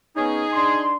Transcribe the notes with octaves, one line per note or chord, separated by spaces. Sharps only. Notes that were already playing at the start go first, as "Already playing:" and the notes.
B3 C#4 D#4 G#4
D4 C6